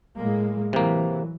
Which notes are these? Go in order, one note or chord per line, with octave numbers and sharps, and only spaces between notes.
A2 G#3 A#3
C3 E3 F#3 A#3